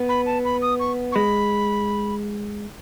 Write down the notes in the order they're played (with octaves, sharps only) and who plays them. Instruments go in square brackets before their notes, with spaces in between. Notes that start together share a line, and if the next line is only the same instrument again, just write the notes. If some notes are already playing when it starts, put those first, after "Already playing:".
Already playing: [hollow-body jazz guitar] B3
[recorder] B5
A5
B5
D#6
C#6
C#6
[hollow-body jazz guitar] G#3 [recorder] B5